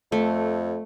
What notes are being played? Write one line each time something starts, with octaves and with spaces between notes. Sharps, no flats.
F2 A3